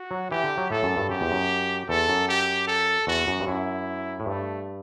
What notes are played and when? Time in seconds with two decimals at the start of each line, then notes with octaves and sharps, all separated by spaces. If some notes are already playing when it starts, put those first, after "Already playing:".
Already playing: F#4
0.11 F#3
0.31 E3 G4
0.44 D3
0.57 F#3
0.70 A2 A4
0.83 F#2
0.96 G2
1.09 F#2 G4
1.21 E2
1.32 F#2
1.89 E2 A4
2.09 F#2
2.28 G4
2.67 A4
3.07 E2 F#4
3.27 F#2
3.41 G2
3.47 F#2 E4
4.20 A2
4.25 G2 A3